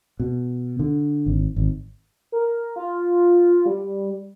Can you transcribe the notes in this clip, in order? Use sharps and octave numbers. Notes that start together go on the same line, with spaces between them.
B2
D3
G#1
G#1
A#4
F4
G3